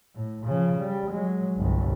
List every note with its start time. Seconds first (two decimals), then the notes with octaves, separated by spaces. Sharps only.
0.15 A2
0.46 C#3 F3
0.79 G3
1.10 F#3 G#3
1.57 G1 C2